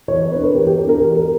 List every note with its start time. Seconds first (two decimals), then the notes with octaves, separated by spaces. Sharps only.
0.08 E3 C#5
0.20 C#5
0.31 B3 D4 B4
0.43 A#4
0.55 E3 G4
0.67 G4
0.78 B3 A#4
0.81 D4
0.89 A#4
1.00 E3 G4
1.17 A#4